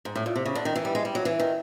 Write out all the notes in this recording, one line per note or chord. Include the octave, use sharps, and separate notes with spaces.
G#2
A2
A#2
C3
C#3
D3
D#3
E3
G3
G#3
G3
F#3
E3
D#3